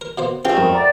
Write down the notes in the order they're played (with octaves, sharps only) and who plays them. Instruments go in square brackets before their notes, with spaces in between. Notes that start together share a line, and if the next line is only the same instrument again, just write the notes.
[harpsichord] A#4
B2 A#3 C5
[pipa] A3 C4 [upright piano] C#4 G4 G#4 [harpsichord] F4
[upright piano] F2 A#4 C#6 [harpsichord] G#2
[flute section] D5 [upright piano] F#5 A#5